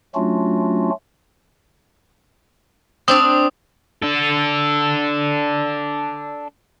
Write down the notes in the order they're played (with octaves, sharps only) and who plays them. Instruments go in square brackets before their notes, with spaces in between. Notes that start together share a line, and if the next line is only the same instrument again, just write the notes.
[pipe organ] F#3 A3 C#4 D4 F4 F#4
[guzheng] C4 D4 D5 [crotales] D#6
[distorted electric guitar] D4 A4